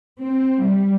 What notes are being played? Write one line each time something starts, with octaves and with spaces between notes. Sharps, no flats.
C4
G3